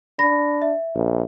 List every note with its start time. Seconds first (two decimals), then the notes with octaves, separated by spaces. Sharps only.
0.19 D4 B5 A#6
0.62 E5
0.95 A#1